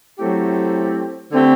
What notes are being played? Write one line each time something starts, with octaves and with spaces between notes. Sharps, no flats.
F#3 A3 C4 E4 G4
D3 A3 C4 G4